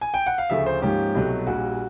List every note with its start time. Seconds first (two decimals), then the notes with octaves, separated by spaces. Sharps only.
0.01 G#5
0.14 G5
0.26 F#5
0.38 F5
0.50 D2 C#3 F3 A3 E5
0.66 C5
0.82 G#2 F3 A#3 C#4 G4
1.15 C2 B2 F#3 A3
1.47 A#1 A#2 G3 F#4